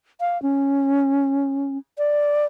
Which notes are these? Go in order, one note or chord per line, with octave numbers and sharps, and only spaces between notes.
F5
C#4
D5